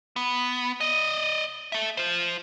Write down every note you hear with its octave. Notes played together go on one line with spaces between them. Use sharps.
B3
D5 D#5
A4 E5
F4 C5